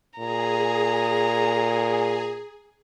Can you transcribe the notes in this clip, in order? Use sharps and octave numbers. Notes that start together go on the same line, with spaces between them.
A#2 G#4 A#5